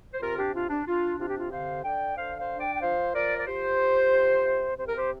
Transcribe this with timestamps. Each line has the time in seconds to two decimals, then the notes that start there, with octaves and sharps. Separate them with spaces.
0.12 C5
0.21 C3 F4 A#4
0.37 D4 G4
0.53 D4 F4
0.69 D4
0.86 D4 F4
1.19 C3 F4
1.28 G4
1.38 F4
1.51 D3 C5 F5
1.84 D3 D5 G5
2.17 D3 C5 F5
2.38 C5 F5
2.49 D4
2.60 D5 G5
2.75 G5
2.81 F3 C5 F5
3.14 F3 A#4 D5
3.38 D5
3.46 F3 G4 C5
3.79 F3
4.12 C3
4.44 C3
4.77 C3 C5
4.87 A#4
4.96 G4 C5